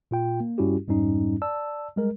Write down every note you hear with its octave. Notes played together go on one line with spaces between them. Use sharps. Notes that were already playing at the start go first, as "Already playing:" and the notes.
A#2 F4 G5
A#3
G2 G3 C#4 E4 F#4 G4
F2 G#2 G3 C#4 D#4
D5 A5 E6
G3 G#3 A#4